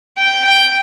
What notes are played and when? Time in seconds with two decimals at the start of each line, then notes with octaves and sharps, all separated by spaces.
0.17 G5
0.45 G5